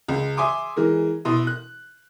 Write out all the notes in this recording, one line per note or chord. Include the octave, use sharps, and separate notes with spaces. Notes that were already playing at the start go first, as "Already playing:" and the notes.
C#2
E5 G#5 C6 D6 D#6
E3 G#3 A#4
B2 E4 C6 D#6
F#6